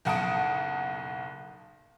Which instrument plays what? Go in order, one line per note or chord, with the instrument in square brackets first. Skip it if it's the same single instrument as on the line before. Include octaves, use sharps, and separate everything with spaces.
[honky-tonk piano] F#1 B1 F#5 A5 D#6 D7